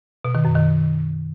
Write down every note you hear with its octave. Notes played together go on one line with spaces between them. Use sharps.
B2
D#3
F#2
D#3